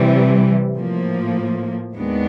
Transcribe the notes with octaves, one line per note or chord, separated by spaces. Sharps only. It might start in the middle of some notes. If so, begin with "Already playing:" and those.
Already playing: C3 E3 G3
A2 F3 A#3
D#2 D#3 G#3 B3 D4